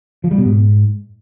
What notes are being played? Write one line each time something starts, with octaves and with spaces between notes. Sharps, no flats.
F3
G3
B2
G#2